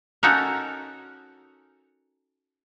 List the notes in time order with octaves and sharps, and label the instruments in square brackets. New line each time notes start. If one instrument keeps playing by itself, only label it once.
[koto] C#4 D#4 F#4 A4 A#4